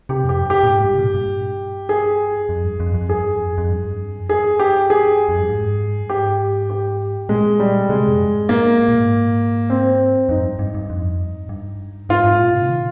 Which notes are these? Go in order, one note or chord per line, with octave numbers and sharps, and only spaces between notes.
C3 G4
F2 G4
G2
G4
A#2
G#2
G2
C3
A#2
G2
G#4
F2
G2
F2
F2
G2 G#4
F2
F2
G2
F2
G2 G#4
G4
G#4
F2
G2
G#2
G2
G#2 G4
G4
A#2 G#3
G3
C3 G#3
F2
G2
G#2
A#2 A#3
G#2
A#2
G#2
C4
F2 D#4
G#2
G2
G2
G2
F2
G2
G2
G#2 F4
G#2
A#2
C3
D#3